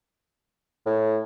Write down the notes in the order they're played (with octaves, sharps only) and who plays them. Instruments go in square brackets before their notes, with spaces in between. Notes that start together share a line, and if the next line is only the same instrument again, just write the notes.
[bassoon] A2